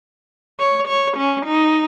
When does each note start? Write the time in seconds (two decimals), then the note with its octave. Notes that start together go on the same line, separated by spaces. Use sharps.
0.60 C#5
0.88 C#5
1.17 C#4
1.46 D#4